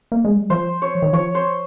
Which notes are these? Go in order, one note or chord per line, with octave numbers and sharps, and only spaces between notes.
A#3
G#3
G3
F3 C5
C#5
D#3
F3 C#5
C5